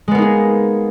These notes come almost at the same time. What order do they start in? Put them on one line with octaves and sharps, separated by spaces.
G#3 B3 A#3 D#4 G#4